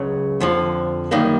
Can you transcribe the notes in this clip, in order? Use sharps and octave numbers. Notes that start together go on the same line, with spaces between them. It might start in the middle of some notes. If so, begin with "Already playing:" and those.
Already playing: C#2 C#3 F#3
F2 D3 F3
F#2 D#3 G3 A#3